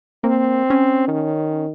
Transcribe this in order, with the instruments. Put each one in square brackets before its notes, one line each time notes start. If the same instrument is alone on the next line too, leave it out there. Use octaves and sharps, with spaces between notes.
[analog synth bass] A#3 [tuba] C4
[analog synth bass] C#4
[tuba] D#3